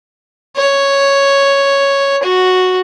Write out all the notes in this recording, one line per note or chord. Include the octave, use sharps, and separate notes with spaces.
C#5
F#4